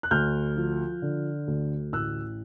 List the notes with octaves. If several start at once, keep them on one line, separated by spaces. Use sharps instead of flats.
F#6
D2 F6 G6
F3
D3
D2
A1 E6 F#6